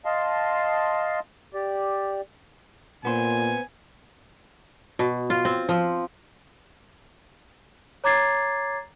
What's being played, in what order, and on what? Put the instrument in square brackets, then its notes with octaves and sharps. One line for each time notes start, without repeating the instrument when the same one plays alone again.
[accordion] D#5 F5 A5 C6
G4 D5
[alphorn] A#2 [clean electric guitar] B3 C5 [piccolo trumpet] G#5
[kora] B2
F4
C4
F3
[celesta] C#5 A#5 D6 G#6 A6 C7